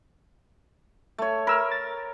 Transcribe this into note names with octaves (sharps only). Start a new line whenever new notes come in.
A3 C#5
A#4 B5 E6 F6
A6